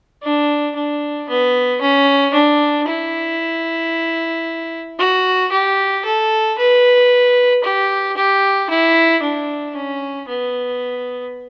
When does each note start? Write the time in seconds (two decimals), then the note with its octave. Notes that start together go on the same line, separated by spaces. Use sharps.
0.23 D4
0.75 D4
1.29 B3
1.81 C#4
2.34 D4
2.88 E4
4.99 F#4
5.51 G4
6.05 A4
6.57 B4
7.63 G4
8.16 G4
8.69 E4
9.23 D4
9.76 C#4
10.28 B3